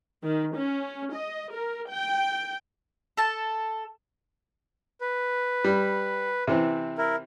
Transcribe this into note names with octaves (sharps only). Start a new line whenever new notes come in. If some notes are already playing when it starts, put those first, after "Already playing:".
D#3
C#4
D#5
A#4
G5
A4 A5
B4
G3
C3 E3 C4
E4 A#4